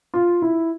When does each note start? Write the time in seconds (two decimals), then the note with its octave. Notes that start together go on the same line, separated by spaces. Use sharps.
0.14 F4
0.42 E4